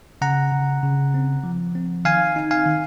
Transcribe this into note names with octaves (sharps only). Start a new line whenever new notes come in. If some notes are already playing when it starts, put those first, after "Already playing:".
C#3 F#5 A#5
C#3
C#3
C4
F3
C4
D#3 F5 G#5
D#4
F5 G#5
D#3